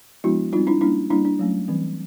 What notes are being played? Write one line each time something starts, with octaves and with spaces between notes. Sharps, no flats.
F3 G#3 B3 D4 E4 F#4
G3 C4 D#4 F4
D4 E4
G3 A#3 C#4 D4 E4
G3 A#3 D4 E4
D4
F#3 A3 C#4
E3 G3 C4